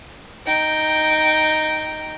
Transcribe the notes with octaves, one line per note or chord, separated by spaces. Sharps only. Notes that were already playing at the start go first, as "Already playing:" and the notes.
D#4 G5